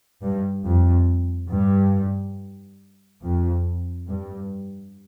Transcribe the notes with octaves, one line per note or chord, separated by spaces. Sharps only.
G2
F2
G2
F2
G2